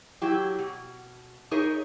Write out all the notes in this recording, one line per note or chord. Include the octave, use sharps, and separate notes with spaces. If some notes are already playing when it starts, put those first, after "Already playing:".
F#3 E4 G4
B2
D#4 G#4 A#4 C#5 D#5 E5